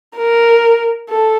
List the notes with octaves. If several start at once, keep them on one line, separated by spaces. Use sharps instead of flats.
A#4
A4